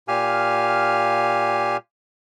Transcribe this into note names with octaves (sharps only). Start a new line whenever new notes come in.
A#2 G4 F5 G#5 F6